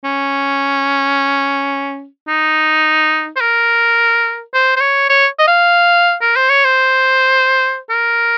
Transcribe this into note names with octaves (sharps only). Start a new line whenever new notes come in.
C#4
D#4
C5
A#4
C5
C5
C#5
C#5
D#5
F5
A#4
C5
C#5
C5
A#4